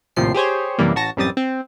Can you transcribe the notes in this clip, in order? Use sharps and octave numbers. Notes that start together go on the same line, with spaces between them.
A#1 D#2 A2 C3 F3 C7
G4 G#4 C5 C#5
F#2 C3 E3 G3 A#3
A1 F#4 A5 A#6
A1 F#2 G3 C4 D#6 A6
C4